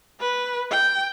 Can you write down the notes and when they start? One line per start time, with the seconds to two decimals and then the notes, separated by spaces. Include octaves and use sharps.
0.20 B4
0.71 G5